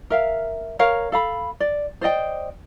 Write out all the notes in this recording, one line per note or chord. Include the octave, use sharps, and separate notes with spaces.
A#4 E5 F5
A#4 C#5 F5
A4 F5 B5
D5
C5 D5 D#5 G5